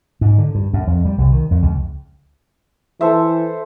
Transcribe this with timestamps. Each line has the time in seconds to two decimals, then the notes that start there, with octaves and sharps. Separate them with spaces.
0.21 G#2
0.38 D3
0.55 G2
0.73 F#2
0.87 F2
1.05 G3
1.18 C2
1.32 D#3
1.51 F2
1.62 C#2
3.01 E3 A4 C5 E5